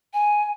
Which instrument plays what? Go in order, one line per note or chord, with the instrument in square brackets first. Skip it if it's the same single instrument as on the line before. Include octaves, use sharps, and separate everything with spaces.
[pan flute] G#5